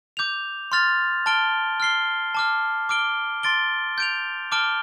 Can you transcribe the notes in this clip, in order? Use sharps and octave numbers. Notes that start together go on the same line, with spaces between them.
D6 G6 F7
C6 F6 A6 F7
A5 F6 D7 G7
F6 C7 G7
A5 D6 F6
D6 F6 D7 G7
C6 A6 D7 G7
G6 D7 F7
A5 D6 F6 D7 G7